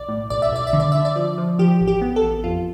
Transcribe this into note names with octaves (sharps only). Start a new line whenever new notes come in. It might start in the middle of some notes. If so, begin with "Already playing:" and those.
Already playing: B1 D5
A2
B1 D5
E5
B1 D5
E5
D3
D5
D3 E5
D5
F3
F3
F3 G4
A1
G4
B3
A4
A1
F2 F4